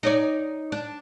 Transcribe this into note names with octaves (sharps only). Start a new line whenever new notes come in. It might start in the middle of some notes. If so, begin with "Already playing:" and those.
D#4 C#5 D5
D4